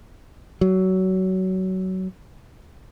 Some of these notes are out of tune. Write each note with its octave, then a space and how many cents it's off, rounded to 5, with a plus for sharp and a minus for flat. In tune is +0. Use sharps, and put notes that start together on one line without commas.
F#3 +20